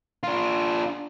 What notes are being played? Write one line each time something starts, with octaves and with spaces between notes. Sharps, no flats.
D4 F4